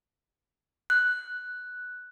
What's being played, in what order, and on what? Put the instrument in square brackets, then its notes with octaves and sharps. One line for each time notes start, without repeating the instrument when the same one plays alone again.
[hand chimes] F#6